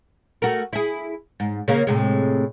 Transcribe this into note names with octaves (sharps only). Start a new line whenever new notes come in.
A3 F#4 A#4
E4 G#4
G#2
C#3 A#3
A2 C3 G#3